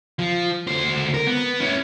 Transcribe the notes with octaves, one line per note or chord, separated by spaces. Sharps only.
F3
D2 C5
A#4
B3
C#4 E4